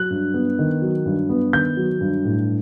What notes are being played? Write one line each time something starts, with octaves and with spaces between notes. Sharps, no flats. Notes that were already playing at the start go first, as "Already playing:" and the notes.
Already playing: F#3 F#6
G2
B3
D#3
F#3
G2
B3
D#3 G6
F#3
G2
A2